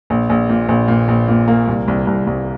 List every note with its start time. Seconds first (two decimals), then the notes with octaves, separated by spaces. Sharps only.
0.10 A#1
0.30 A#1
0.49 A#2
0.69 A#1
0.88 A#2
1.08 A#1
1.28 A#2
1.48 A#3
1.68 C2
1.88 C2
2.07 C2
2.27 C2